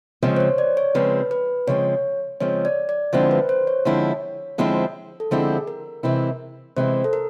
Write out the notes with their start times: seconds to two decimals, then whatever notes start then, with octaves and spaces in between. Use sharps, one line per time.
0.23 C#3 F3 G#3 C4 C#5
0.36 C5
0.40 C#5
0.58 D5
0.77 C#5
0.95 C#3 F3 G#3 C4 B4
1.31 B4
1.67 C#3 F3 G#3 C4 C#5
2.40 C#3 F3 G#3 C4 C#5
2.65 D5
2.89 D5
3.13 D3 F3 G#3 C4 E4 C5
3.31 B4
3.49 C5
3.67 C#5
3.85 D3 F3 G#3 C4 E4
4.58 D3 F3 G#3 C4 E4
5.20 A4
5.31 D3 F3 G#3 C4 E4 G#4
5.67 A#4
6.03 C3 E3 G#3 C4 E4
6.76 C3 E3 G#3 C4 E4 C5
7.04 A4
7.13 A#4